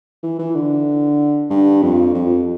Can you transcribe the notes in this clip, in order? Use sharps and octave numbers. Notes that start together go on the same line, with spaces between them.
E3
E3
D3
G2
F2
F2